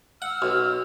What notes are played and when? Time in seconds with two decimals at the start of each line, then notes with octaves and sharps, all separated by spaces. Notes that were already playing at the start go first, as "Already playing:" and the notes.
0.22 F#5 E6 F6
0.42 B1